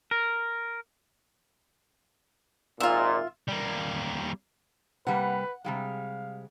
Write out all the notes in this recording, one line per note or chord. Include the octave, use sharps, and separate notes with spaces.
A#4
G#1 A#2 F4 E5
G3 A#3
C3 G3 A#3 B4 F#5
C3 G3 G#3 F5